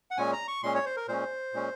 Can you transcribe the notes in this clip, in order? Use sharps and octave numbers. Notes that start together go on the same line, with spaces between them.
F#5
A#2 G#3 C#4 G#5
A#5
C#6
A#2 G#3 C#4 C6
C#5
C5
A#4
A#2 G#3 C#4 C5
A#2 G#3 C#4